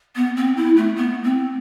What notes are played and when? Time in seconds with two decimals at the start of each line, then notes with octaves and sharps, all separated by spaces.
0.16 B3
0.37 C4
0.57 E4
0.77 A3
0.96 B3
1.24 C4